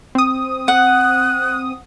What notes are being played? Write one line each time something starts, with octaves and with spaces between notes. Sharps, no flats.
C4 D#6
F#5 F#6